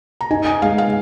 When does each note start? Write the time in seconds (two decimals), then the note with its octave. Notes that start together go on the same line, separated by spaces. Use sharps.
0.21 A#5
0.30 D#4 G#5
0.46 G#5
0.62 G#3 F5
0.78 F5